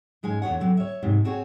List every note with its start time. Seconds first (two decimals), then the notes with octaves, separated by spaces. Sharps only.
0.23 G#2 G#3 C#4 G#5
0.42 E2 D3 C#5 F#5
0.60 D3 F#3 C4
0.77 C#5 E5
1.03 G#2 C3
1.24 C4 F#4 G#4 C#5